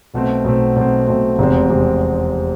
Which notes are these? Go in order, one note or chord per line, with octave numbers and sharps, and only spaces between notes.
B1 B2 A3 C4
B1 B2 A3 C4
B1 B2 A3 C4
B1 B2 A3 C4
F1 E2 C3 G#3 C4
F1 E2 C3 G#3 C4